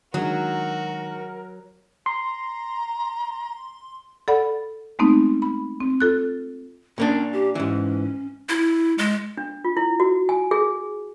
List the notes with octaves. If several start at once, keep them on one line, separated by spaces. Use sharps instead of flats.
D#3 F#3 G#3 D4 F#4 A#4
A#5 C6
A4 D5 F#5 B5
G#3 A3 B3 C4 D#4
B5
C4
F4 A4 F#6
A#2 A#3 C#4 D4
G4
G#2 E3 C#4
E4
G#3
D4
F4
E4
F#4
G#5
G#4